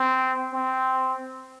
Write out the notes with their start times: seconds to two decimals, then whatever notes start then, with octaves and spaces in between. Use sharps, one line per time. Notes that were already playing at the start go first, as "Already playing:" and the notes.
Already playing: C4
0.53 C4